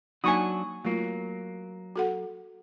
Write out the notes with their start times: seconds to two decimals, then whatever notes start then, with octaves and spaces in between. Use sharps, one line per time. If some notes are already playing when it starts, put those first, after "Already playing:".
0.24 F#3 A#3 D4 D#4 F#4 G#5 C#6 D#6
0.85 F#3 A3 A#3 F4
1.96 F#4 A4 F#5